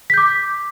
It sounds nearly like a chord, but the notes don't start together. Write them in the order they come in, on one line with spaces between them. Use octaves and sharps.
B6 G6 D6